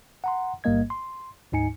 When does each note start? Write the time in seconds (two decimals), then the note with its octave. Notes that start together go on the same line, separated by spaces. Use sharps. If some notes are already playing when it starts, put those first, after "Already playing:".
0.24 F#5 A#5 C6
0.64 A1 G#2 G3 A#3 D#5 G#6
0.90 C6
1.52 D2 G#2 D#4 G#5 C#7